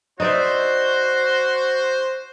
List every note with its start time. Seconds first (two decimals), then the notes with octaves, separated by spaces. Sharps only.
0.20 D#4 F#4 C5 D5 E5